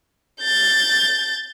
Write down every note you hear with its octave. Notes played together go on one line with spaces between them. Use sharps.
G6 A6